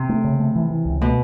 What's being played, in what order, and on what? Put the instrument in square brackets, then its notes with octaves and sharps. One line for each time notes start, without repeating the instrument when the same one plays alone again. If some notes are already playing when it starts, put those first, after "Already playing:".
Already playing: [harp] C3
[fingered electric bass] A3
C#3
A3
E3
E3
C#2
[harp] B2 [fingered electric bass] A3